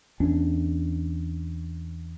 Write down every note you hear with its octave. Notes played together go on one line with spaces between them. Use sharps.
E2 C#4 D4